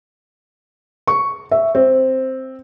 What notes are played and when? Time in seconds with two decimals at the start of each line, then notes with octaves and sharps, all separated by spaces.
1.07 C#6
1.51 E5
1.75 C4